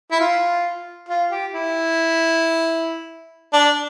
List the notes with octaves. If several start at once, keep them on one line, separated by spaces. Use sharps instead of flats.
E4
F4
F4
G4
E4
D4